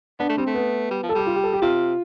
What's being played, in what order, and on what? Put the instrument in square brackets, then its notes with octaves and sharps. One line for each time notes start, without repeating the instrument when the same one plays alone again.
[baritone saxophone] B3 [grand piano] D4
[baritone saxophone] A3
[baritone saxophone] G3 [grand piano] C4
[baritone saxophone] A3
[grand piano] B3
[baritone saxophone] G3
F3
[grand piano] A4
[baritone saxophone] G3 [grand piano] G4
[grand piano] F4
G4
A4
G4
[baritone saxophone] C3 [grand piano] F4